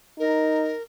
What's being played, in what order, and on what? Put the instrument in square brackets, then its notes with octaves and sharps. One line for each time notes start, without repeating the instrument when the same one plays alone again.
[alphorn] D#4 [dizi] A#4